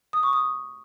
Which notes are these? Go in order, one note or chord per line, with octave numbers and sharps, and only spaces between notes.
D#6
C#6
D#6